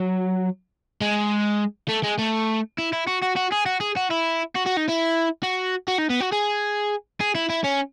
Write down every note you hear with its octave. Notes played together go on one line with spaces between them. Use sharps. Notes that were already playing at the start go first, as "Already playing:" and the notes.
Already playing: F#3
G#3
A3
G#3
A3
E4
E4
F#4
F#4
F#4
G#4
F#4
G#4
F#4
E4
F#4
F#4
D#4
E4
F#4
F#4
D#4
B3
F#4
G#4
G#4
E4
E4
C#4